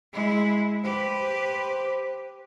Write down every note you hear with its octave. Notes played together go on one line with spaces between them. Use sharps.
G#3 E4
G4 B4 C5